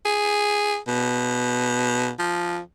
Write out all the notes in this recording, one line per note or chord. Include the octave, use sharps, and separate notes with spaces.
G#4
B2
F3